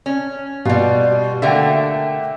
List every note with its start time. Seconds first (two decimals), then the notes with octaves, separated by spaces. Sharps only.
0.06 C#4
0.65 B2 G3 F4
1.42 D3 A3 A#3 E5 F#5 G5